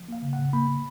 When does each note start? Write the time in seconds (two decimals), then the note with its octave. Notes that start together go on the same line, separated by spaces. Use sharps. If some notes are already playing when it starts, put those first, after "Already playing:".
Already playing: F3
0.08 A#3 F5
0.22 C#3
0.33 F#5
0.39 C#3
0.53 A#3 B5
0.68 A#3